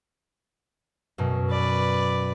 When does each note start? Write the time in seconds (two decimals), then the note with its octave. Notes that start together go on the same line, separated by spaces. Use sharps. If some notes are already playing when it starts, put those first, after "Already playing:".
1.18 F#2 B2
1.50 B4 D5